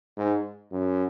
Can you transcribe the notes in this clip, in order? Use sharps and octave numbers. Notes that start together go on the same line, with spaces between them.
G#2
F#2